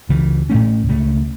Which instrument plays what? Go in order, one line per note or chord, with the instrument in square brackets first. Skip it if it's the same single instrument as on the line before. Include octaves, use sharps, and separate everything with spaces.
[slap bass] C#2 C#3 E3
A2 A3 C#4
C#2 C#3 A3